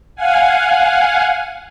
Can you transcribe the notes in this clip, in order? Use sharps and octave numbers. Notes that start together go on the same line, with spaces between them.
F5 F#5 G#5